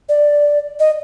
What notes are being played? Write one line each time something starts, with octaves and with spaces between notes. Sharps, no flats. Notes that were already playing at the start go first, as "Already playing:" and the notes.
D5
D#5